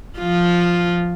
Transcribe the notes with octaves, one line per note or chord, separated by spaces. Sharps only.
F3 F4